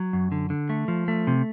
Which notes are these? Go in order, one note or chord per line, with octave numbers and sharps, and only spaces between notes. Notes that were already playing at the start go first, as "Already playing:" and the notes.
Already playing: F#3
F#2
D3
D3
A3
F3
A3
C3